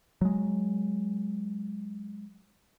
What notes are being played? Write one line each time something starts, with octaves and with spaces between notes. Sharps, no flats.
F#3 G#3